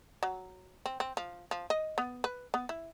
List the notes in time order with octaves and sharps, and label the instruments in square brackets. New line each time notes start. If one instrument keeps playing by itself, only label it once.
[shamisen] F#3
C4
C4
F3
F3
D#5
B3
B4
B3
E4